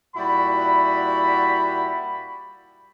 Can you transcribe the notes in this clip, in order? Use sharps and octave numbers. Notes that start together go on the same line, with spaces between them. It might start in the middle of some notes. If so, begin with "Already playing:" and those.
A#2 G3 E4 F#4 B5